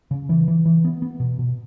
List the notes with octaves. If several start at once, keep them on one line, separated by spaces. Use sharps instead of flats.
C#3
E3
E3
E3
B3
B3
B2
B2